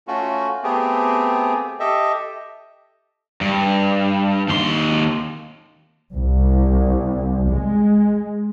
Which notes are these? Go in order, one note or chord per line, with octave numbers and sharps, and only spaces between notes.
A3 C#4 F4 F#4
A3 B3 C4 G4 G#4
G4 A4 D#5 E5
G2
D#2 C6
C2
G#3